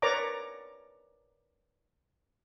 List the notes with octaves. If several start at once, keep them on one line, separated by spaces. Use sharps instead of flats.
A#4 B4 C#5 D5 A#5 D6